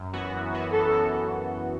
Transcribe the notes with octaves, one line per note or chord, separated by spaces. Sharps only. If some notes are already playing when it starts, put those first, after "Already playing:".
Already playing: F#2
E3 B3 F#4
F#2
E3 B3 F#4
F#2 A4
E3 B3 F#4